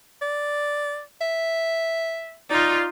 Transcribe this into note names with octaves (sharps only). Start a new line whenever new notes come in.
D5
E5
D#4 F4 D5